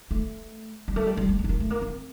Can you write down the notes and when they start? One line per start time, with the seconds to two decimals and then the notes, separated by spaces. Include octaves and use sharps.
0.11 A3
0.88 G3
0.96 A3
1.07 G3
1.17 G3
1.29 A3
1.39 A3
1.44 C4
1.49 A#3
1.60 A3
1.70 A#3
1.82 C4